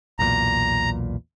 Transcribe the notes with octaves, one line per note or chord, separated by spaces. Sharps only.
B1 E2 A#2 A#5